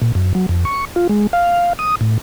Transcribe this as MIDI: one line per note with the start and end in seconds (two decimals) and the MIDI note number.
0.02 0.12 46
0.15 0.33 42
0.35 0.46 54
0.49 0.65 41
0.65 0.85 85
0.96 1.07 65
1.09 1.27 56
1.33 1.73 77
1.79 1.95 87
2.01 2.18 45